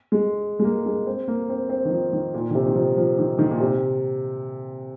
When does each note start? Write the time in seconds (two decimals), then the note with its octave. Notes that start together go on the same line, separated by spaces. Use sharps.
0.12 G#3
0.59 G#3
0.64 A#3
0.86 G#3
1.06 C4
1.28 A#3
1.49 C4
1.69 C4
1.85 D#3
1.91 F3
2.13 D#3
2.34 A#2
2.51 D#3
2.55 C3
2.66 D#3
2.75 F3
2.97 F3
3.18 D#3
3.39 D#3
3.51 A#2
3.60 C3